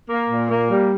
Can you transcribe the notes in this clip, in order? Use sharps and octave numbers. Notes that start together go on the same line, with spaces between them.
A#3
A#2
A#3
G3